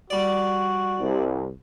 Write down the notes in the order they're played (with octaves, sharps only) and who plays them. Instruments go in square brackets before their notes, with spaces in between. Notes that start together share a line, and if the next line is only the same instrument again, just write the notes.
[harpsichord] G3 D5 [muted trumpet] F#4
[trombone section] C2